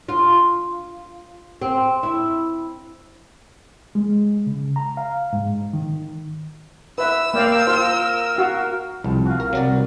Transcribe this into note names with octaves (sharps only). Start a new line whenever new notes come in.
F4
C4
E4
G#3
C#3
A#5
F5
G#2
D#3
B4 E5 E6
A#3 A#4 D5 F5 G5
F4 A#4 C5
F#4 F5
C2 F3
F#4 F5
A#4
C3 F#3 A#4 D5
C2 C3